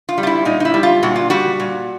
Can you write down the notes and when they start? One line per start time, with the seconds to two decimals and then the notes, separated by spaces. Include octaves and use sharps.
0.09 F4
0.18 G3
0.23 F4
0.27 E4
0.45 A#2 D#4
0.60 D#4
0.65 E4
0.74 G3
0.83 F4
1.03 A#2 F#4
1.16 F4
1.30 G3 F#4
1.60 A#2